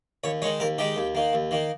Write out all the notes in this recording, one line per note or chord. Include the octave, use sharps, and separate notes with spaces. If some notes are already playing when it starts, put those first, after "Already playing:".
D#2 C#5
D#3 G#3 C#5
D#2 A#4
D#3 G#3 G4
D#2
D#3 A#3
D#2
D#3 A#3